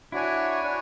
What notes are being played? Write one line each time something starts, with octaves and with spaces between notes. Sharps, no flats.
D4 E4 F#4 C#5 G#5
D4 F#4 C#5